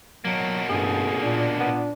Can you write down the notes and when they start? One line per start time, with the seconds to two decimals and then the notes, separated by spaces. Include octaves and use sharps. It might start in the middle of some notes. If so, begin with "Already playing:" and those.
0.25 B2 F#3 A#3
0.70 A1 G2 G#4
1.22 A#2 D4
1.60 A#2 B3